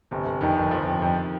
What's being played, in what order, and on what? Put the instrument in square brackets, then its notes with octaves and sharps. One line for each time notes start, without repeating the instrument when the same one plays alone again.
[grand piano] G1 [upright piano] C3
[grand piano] G1
[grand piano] F2 [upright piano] D#3
[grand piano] G1
[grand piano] G1 [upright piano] F3
[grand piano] F2
F2